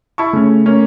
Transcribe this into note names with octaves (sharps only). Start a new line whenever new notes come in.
E4 A5 C#6
C#3 A3 C#4 A4
A#3 C#4